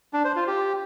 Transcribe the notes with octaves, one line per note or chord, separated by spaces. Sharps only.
D4
C5
F4
G4